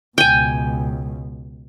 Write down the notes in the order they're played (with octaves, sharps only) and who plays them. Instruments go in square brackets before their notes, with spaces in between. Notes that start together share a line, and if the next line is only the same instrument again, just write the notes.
[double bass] C#2 B2 [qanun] G5 G#5